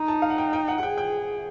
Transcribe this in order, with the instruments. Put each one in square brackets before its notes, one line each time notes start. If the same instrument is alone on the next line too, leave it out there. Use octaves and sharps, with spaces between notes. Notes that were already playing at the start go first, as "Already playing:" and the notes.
Already playing: [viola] D#4 [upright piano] A#5
[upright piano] A5
F5
F#5
G5
G5
F#5
F#5
[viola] G#4 [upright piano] G5
[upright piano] G5